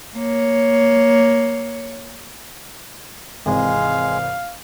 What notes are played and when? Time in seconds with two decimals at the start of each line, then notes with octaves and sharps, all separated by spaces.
0.15 A#3 C#5
3.46 G#1 C3 E3 G#3 F5